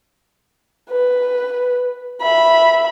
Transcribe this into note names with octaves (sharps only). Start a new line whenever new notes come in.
B4
E5 B5